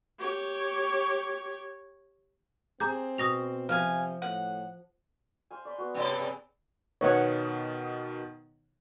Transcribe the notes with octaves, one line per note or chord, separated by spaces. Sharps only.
G4 C#5
C4 G#4 A#5 D6 G6
B2 D#6 A#6 F7
C3 F3 F5 G#5
A2 F#5
C5 F5 G#5
D5 B5 C6
B3 F#4
G2 C3 D5 G5 G#5
G#4 D#6
B2 D#3 B3 C#5 F#5